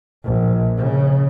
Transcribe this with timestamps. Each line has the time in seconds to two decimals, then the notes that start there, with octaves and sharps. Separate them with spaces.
0.25 A#1
0.77 C#3